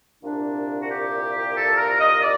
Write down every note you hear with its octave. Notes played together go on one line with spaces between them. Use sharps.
C2 A#2 D4
F#4
G4
A4
A#4
D#5
D5